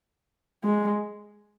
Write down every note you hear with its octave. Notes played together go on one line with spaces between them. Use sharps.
G#3